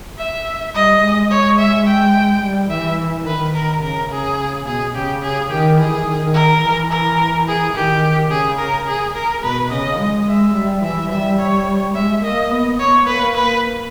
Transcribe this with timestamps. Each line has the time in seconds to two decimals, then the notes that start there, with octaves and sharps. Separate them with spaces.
0.19 E5
0.75 G3 D#5
1.02 G#3
1.31 G#3 C#5
1.59 E5
1.86 G5
2.42 G3
2.70 E3 E5
3.26 D#3 B4
3.55 A#4
3.83 C#3 A#4
4.10 C#3 G#4
4.66 B2 G#4
4.95 C#3 G4
5.22 G#4
5.50 D#3 G4
5.79 E3 G#4
6.07 D#3
6.34 A#4
6.62 E3
6.90 A#4
7.47 G#4
7.74 D#3 G4
8.31 C#3 G#4
8.59 A#4
8.88 G#4
9.15 A#4
9.43 B2 B4
9.71 C#3 D#5
9.99 G#3
10.27 G#3 E5
10.56 G3
10.82 E3 E5
11.10 G3 E5
11.39 C#5
11.95 G#3 E5
12.23 A#3 D#5
12.51 B3
12.79 C#5
13.07 A#3 B4
13.35 B4